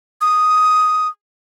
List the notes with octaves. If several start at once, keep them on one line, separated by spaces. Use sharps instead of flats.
D#6